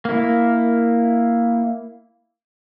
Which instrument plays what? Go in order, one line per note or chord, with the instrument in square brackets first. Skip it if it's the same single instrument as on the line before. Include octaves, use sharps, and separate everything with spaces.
[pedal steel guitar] A#3 E4